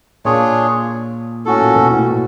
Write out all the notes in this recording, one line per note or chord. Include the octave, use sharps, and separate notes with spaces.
A#2 D4 F4 G#4 C#5
A2 C#4 F#4 A4
A#2
B2
A2
A2